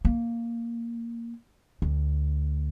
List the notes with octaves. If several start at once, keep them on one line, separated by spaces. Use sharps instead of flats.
A#3
D2